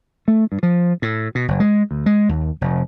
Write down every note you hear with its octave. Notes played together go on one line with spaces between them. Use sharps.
A3
G2
F3
A2
B2
F#1
G#3
D2
G#3
D#2
F1